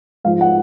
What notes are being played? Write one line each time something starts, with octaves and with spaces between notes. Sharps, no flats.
G#2 F3 F5
F#5